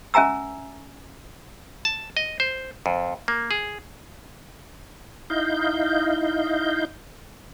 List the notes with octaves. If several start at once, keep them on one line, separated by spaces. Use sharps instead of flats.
C#4 E5 G#5 A#5 E6
A5
D#5
C5
F2
A#3
G#4
D#4 E4 D#5 F5 G6